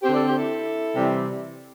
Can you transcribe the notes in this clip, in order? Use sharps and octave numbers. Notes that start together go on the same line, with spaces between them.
C4 G4 C5
D3
A4 D5
G4 C5
E4 A4
C3 E3 G3 C4